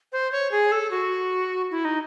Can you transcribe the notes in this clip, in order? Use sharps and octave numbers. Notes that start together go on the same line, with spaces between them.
C5
C#5
G#4
A4
F#4
E4
D#4